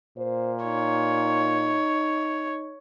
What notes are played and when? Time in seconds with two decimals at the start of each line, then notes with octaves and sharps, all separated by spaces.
0.17 A#2 C5
0.65 D#4 C#5